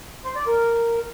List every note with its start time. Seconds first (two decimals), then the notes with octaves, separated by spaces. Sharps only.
0.25 C5
0.36 D5
0.47 A#4